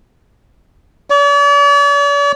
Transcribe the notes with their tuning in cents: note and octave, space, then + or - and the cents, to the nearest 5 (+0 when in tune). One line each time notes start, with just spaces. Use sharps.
D5 -45